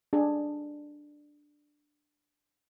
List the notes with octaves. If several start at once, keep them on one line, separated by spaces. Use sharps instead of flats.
D4 G#4